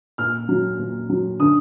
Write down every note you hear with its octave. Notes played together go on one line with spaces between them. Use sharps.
A#2 F6
F#3
A#2
F#3
D3 D#6